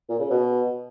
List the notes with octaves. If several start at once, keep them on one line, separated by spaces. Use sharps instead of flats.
A#2
C#3
B2